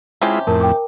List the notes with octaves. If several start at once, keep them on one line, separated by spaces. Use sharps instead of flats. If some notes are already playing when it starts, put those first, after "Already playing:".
C3 G#3 C#4 E4 F4 G4
F2 A2 A#4 A5
G5 D6